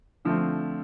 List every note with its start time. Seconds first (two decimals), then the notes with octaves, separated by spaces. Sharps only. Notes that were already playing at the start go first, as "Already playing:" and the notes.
0.25 D3 F3 A3 C4